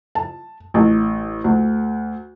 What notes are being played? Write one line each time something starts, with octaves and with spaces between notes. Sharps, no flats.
A5
A1
D2